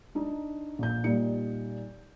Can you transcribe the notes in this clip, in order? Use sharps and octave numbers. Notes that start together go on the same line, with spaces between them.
D4 D#4
A#1 G6
A#2 G3 D#4 C#7